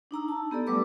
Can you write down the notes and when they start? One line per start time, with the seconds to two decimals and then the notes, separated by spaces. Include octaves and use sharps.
0.11 D4 D#4 A#5 E6
0.28 A5
0.51 B3 G4 A4 D5
0.67 F#3 G3 A3 B4 D6 E6